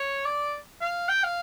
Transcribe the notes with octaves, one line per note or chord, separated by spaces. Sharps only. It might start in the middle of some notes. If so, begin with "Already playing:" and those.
Already playing: C#5
D5
F5
G5
F5